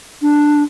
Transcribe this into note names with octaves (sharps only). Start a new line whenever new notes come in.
D4